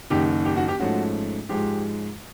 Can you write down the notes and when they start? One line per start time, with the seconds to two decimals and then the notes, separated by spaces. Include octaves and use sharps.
0.10 F#1 F#2 D#3 G4
0.45 G4
0.57 F#4
0.68 G4
0.79 G#2 F3 A3 C#4 F#4
1.49 G#2 F3 G#3 G4